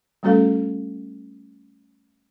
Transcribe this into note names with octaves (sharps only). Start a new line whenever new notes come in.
G3 A3 C#4 F#4 A4 F5